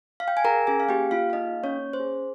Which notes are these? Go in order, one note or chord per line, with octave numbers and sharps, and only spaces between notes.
F5
G5
G#5
G#4 A#4 A#5
C#4 G#4 G#5
F5
A#3 G4 G5
A#3 F4 F5
F5
D#4 G#4 D#5
A#3
C#4 C#5
C#4
C5
G#4